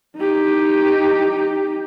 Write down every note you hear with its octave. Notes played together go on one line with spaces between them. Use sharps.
D#4 G4